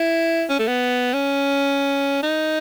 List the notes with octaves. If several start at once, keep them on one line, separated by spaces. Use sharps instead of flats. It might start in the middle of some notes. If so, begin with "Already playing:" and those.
Already playing: E4
C#4
A3
B3
C#4
D#4